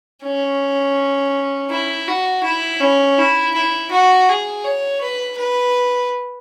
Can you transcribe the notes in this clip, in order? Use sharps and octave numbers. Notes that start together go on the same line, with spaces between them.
C#4
E4
F#4
E4
C#4
E4
E4
F#4
G#4
C#5
B4
B4